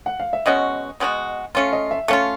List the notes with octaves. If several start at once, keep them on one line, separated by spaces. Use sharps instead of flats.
F#5
F5
E5
B2 G#3 C#4 F#4 D#5
B2 G#3 C#4 F#4
A3 C#4 F4 F5
D#5
E5
A3 C#4 F4 F5